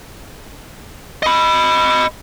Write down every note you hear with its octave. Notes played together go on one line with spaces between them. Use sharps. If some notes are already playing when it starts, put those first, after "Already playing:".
D#5 B5